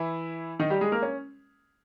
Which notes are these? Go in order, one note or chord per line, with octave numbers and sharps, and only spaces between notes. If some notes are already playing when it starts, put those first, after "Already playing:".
Already playing: E3 E4
D#3 D#4
G3 G4
G#3 G#4
A#3 A#4
C#4